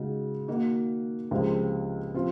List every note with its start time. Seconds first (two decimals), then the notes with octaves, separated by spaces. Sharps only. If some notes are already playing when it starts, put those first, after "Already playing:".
Already playing: C#3 G#3 D#4 F#4
0.48 D#3 A#3 D#4 F#4
1.31 C#2 C3 F3 G#3 C4
2.14 C3 F3 C4 F4